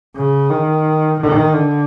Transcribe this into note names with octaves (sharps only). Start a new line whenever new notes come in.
C#3
D#3
D#3
D3